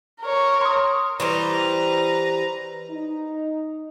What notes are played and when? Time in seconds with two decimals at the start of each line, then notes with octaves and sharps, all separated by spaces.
0.22 A#4 C#5
0.61 C6 D#6
1.20 E3 G3 B4 C5 A#5
2.91 D#4